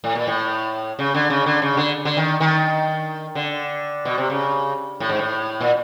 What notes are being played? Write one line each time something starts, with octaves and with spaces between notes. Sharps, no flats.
A2
A#2
A2
C#3
D3
C#3
D3
C#3
D3
D3
D#3
D#3
D3
B2
C3
C#3
A2
G#2
A2
A#2